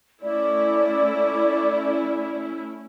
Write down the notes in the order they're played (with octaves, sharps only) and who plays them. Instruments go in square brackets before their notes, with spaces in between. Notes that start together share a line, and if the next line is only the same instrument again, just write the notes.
[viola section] A3 C#4 E4 [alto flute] D5